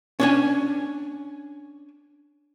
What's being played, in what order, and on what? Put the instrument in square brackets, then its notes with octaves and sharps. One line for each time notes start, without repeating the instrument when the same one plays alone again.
[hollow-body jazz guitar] C#4 D4 G#5